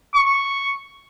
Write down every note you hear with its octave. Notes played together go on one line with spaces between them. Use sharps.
C#6